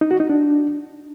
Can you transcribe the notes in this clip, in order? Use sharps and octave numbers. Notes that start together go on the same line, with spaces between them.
D#4
F#4
D#4
D4